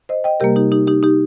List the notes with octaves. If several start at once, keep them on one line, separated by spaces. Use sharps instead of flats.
C5 D#5
D#5 G5
C3 G3 A#3 G4 A#4
D#4 G4
D#4 G4
D#4 G4
D#4 G4